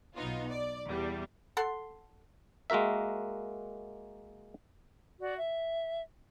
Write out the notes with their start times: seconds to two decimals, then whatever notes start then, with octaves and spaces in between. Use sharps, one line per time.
0.15 B1 B3 D#4 F4
0.47 D5
0.86 E2 G3
1.57 A4 F#5 C6
2.70 G#3 A#3 F#4 A#4 E5
5.19 F#4 D5
5.37 E5